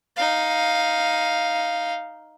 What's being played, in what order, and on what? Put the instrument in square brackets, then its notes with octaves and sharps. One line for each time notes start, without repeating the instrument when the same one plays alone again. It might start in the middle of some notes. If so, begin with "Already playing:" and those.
[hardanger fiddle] D#4 F5